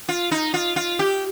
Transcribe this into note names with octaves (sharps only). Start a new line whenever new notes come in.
F4
D#4
F4
F4
G4